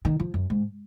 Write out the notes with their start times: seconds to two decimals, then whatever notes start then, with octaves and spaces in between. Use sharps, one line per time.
0.05 D#3
0.20 F3
0.34 F#2
0.50 G#2